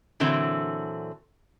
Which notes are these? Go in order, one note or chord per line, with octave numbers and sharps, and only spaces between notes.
A#2 D3 E3 F#3 C4